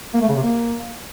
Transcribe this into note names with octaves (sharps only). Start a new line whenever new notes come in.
A#3
A3
C#3
C3
A#3